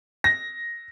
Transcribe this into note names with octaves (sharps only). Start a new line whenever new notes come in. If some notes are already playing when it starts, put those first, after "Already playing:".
A#6